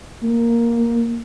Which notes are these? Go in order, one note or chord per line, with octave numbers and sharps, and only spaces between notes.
A#3